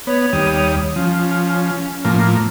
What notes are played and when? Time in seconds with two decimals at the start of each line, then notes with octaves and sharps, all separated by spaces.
0.07 B3 C#5
0.33 D#2 G3 D#6
0.96 F3 C#4
2.05 A2 F3 A#3